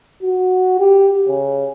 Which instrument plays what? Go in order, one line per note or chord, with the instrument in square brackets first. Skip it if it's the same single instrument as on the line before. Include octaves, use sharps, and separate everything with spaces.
[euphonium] F#4
G4
C#3